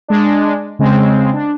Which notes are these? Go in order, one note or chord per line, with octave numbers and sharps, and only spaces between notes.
G#3 D4
C#3 G#3 C4
D4